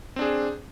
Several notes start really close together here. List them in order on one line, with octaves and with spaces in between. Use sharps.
C4 D4 G#4